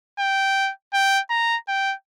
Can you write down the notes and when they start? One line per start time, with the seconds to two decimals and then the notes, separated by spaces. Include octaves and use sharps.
0.19 G5
0.94 G5
1.30 A#5
1.68 G5